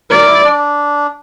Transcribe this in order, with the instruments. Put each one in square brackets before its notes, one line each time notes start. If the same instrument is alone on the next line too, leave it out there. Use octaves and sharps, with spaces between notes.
[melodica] A#4 [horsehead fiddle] D5
[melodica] E4
D4